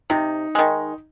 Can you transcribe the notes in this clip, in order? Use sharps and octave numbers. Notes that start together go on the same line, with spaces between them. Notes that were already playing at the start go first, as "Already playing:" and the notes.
C3 D#4
D#3 G#3